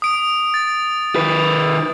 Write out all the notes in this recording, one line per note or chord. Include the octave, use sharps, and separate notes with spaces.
D#6 D7
A6
D#3 B4